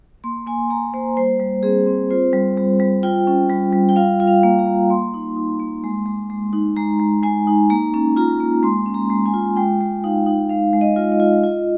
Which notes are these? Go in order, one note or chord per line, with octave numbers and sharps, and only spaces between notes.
A#3 C6
A#3 G#5
A#3 A#5
A#3 C5
G3 C5
G3
C4 G#4
C4
F4 C5
G3
G3
G3
F4 G5
C#4
G3
G3
G5
F4 F5
F4
F5
A#3
A#5
A#3
A#3 C6
D#4
D#4
A#3
G#3
G#3
G#3
D#4
G#3 A#5
G#3
G#3 G#5
D#4
A#3 A#5
C#4
F4 A#5
A#3
G#3 C6
C#4
A#5
G#3
G#5
F4
G#3 G5
G#3
D#4 F5
D#4
G#3 F5
G#3
D#5
F4
D#5
F4
F4